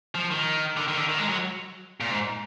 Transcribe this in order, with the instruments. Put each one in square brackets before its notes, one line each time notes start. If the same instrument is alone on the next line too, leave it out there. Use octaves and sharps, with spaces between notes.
[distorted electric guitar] F3
D#3
D3
D#3
D3
D#3
G#3
F#3
A#2
G#2